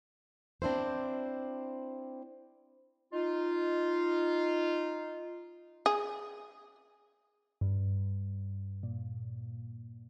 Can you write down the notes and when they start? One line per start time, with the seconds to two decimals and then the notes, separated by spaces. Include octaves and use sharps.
0.62 C4 D4 E4 C5
3.13 D#4 F4
5.86 G#4
7.61 G2
8.83 A#2